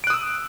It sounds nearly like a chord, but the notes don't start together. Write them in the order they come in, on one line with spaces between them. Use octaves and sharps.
D7 F#6 D#6 E6